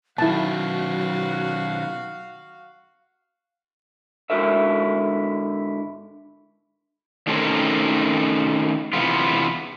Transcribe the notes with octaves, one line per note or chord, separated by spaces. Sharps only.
B2 D#3 F#3 E4 F#4 F5 A5
G#2 D3 E4 F#4 A#4 E5
D#3 A3 C4 C#4 G#4 A#4
E2 C3 B3 F4